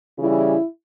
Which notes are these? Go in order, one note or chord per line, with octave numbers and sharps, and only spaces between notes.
C#3 E3 G3 E4